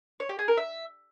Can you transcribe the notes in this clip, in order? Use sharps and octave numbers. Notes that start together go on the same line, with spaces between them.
C#5
G4
G#4
A#4
E5